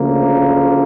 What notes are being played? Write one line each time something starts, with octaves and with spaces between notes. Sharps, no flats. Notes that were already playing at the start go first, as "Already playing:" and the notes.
Already playing: D2 C#3 F3 A#3